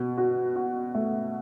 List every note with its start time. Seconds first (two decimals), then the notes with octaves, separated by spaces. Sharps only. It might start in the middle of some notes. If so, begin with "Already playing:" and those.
Already playing: B2
0.17 F#4
0.56 F#4
0.95 A3